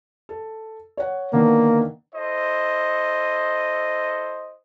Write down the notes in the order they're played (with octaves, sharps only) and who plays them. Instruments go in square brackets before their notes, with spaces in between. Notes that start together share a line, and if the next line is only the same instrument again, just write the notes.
[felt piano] A4
C#5 F#5
[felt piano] D3 D#3 B3 [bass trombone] A#3
[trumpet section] E4 A4 C5 D#5